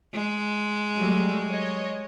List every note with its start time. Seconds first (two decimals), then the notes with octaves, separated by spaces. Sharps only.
0.14 G#3
0.98 F#3 G3 A3
1.49 C#5 D#5